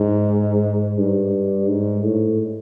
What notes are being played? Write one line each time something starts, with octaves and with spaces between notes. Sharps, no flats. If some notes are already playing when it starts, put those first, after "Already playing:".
Already playing: G#2
G2
G#2
A2